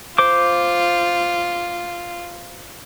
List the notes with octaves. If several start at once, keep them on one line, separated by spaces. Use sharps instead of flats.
F4 C5 D6